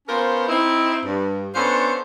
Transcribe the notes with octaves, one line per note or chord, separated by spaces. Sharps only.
B3 C#4 F4 A#4 C5
C4 D#4 E4
G2
B3 C#4 D4 F4 A4 C5